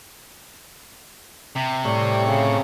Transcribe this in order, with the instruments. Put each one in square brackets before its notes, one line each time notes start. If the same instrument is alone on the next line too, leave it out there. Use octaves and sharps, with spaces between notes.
[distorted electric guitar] C3
[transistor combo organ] A2 C#5 [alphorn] G3
[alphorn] C#3